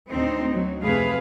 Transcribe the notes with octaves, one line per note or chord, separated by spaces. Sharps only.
D2 A2 C4 D#4
F#3
F2 C3 A3 G#4 B4 F5